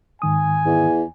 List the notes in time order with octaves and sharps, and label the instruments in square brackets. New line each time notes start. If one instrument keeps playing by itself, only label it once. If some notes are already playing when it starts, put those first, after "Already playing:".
[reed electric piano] G#2 D#3 D#6 [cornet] G#5
[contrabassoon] E2